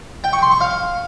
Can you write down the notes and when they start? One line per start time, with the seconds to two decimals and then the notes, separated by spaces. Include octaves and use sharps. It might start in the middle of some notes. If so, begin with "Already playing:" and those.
0.24 G5
0.33 C#6
0.42 C6
0.51 C#6
0.61 F5